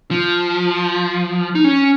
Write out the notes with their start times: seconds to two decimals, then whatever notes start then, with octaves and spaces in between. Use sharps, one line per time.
0.11 F3
1.55 D#4
1.64 C#4